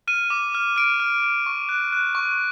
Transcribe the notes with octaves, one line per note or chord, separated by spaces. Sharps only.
F6 D#7
D6
F6
F6 D7
F6
F6
C#6
F#6
F#6
C#6